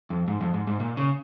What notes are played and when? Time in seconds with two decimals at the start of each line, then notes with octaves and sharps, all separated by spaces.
0.10 F2
0.28 G#2
0.41 F2
0.54 G#2
0.67 G#2
0.80 A#2
0.97 C#3